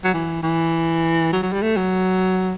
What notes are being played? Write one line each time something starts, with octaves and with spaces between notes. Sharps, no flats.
F#3
E3
E3
F#3
F#3
G3
A3
F#3